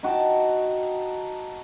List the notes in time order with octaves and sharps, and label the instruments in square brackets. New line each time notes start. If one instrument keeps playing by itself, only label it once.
[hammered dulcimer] D#4 F#4 G5 A5